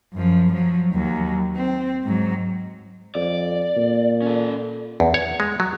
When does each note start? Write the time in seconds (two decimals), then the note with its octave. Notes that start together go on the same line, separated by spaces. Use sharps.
0.14 F#2 F3
0.53 F3 F#3
0.93 D#2 F#3
1.56 C4
2.04 G#2 F#3
3.15 F2 D5
3.76 A#2
4.22 C#4 A4
5.00 E2
5.14 C#5
5.40 G#3
5.60 F#3